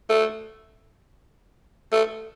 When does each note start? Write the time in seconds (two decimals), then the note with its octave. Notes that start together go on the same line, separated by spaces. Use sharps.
0.10 A3
1.93 A3